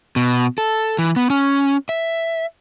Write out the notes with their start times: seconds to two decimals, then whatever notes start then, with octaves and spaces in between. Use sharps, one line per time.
0.16 B2
0.58 A4
0.98 E3
1.16 B3
1.30 C#4
1.89 E5